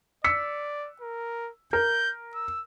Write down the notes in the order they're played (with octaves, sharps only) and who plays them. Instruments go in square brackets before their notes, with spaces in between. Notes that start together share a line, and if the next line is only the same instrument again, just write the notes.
[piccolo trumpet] D5 [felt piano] E6 B6 C#7
[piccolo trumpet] A#4
[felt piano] A#4 [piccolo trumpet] G6
[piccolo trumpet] E6